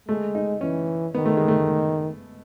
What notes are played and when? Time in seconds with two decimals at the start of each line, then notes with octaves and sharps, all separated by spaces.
0.08 G#3 A3
0.35 D#4
0.61 E3 C#4
1.14 D#3 B3
1.26 A3
1.37 G#3
1.48 A3